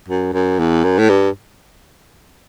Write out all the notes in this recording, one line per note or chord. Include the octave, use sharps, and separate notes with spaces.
F#2
F#2
E2
F#2
A2
G2